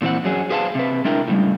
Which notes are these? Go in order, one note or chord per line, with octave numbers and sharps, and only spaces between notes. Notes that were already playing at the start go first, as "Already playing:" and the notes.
A#2 E3 C4 F#5
F#2 F#3 G#4
G#4 B4 C5 F5 G5 A5
C3 B4
G#3 D4 E4 A#4 G5
A2 C#3 F3 G3